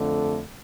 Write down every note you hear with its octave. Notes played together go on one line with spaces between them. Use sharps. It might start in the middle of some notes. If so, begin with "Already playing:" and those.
Already playing: F2 D3 A3